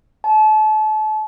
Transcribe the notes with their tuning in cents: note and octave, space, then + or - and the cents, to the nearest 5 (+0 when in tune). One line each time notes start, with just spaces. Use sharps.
A5 -35